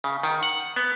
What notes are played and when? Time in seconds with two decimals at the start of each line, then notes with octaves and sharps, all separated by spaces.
0.04 C#3
0.23 D#3
0.43 F#5
0.76 B3